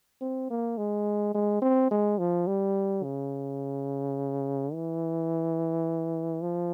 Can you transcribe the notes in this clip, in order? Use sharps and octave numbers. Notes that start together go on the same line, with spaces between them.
C4
A#3
G#3
G#3
C4
G#3
F3
G3
C#3
E3
F3